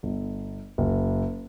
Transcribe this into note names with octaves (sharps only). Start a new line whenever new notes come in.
G1
F#1